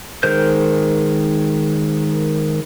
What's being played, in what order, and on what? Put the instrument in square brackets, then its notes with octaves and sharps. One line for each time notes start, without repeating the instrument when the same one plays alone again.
[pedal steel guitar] D#3 G#3 A#4 C5 G6